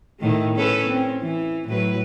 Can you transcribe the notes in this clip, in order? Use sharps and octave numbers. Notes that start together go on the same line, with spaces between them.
A2 D#3 A3
C#4 A4 B4
C4 C#4
E3
A2 F#3 B4